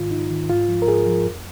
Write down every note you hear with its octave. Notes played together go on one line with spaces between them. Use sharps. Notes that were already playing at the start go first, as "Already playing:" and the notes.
Already playing: G#2 D#3 F4
G#2 D#4
D#3
G#2 F4
F3
A#4
G#2 G#4
F3
F2